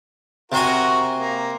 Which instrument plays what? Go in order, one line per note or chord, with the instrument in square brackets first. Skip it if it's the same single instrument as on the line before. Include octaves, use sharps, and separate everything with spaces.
[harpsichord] C3 C5 G#5 [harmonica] F#4 A#4
[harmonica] A#3